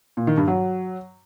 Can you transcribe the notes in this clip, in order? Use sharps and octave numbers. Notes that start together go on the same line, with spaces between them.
A#2
D#3
G2
F#3